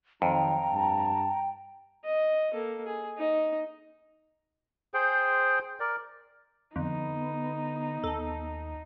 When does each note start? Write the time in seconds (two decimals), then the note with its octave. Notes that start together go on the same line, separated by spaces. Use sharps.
0.22 F2 D#3 F#3 D#4 G5 A#5
0.71 G2 A5
2.04 D#5
2.53 A#3 A4
2.86 G#4
3.18 D#4 D#5
4.94 G#4 C5 G5
5.80 A#4 D5
6.76 F2 D3 B3 D#4
8.04 D#2 A4